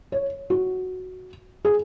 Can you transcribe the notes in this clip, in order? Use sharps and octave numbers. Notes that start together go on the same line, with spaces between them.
C#5
F#4
G#4